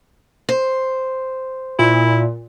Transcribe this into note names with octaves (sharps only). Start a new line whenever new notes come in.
C5
A#2 E4